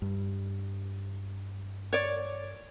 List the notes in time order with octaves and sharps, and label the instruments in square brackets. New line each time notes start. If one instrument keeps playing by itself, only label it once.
[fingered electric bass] G2
[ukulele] C#5 D5